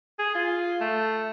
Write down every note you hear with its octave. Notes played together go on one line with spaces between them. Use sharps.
G#4
F4
A3